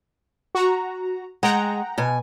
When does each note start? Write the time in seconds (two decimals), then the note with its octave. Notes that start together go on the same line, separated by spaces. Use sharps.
0.55 F#4 A#5
1.43 G#3 F#5 G5 A#5
1.98 B2 G#5